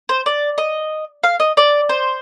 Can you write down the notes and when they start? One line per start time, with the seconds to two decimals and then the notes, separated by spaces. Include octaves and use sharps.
0.09 C5
0.26 D5
0.58 D#5
1.24 F5
1.40 D#5
1.57 D5
1.89 C5